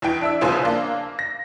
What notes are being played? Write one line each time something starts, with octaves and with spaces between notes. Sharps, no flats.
E2 E3 G5 D7
D4 E5 E6
C2 C#3 F3 B3 C5 G#5
A#3 D4
A#6